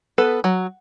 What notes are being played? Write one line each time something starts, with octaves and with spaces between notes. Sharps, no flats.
B3 A4 B4
F#3